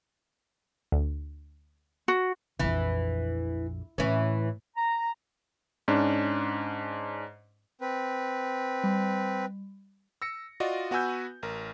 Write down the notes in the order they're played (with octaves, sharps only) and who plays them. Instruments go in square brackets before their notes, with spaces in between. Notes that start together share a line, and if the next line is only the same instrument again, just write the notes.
[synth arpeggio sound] D2
[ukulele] F#4
[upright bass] A#1 F2 [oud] E3
[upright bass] A2 [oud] E3 C#4
[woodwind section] A#5
[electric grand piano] G#2 C#4 D4
[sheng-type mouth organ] C4 B4
[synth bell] G3
[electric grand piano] E6 A#6 C#7
F4 F#4 D5 D#5
B3 F#4 B4 G#5 E6 G6
A1 A#4